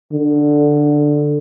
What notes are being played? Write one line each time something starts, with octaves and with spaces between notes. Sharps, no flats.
D3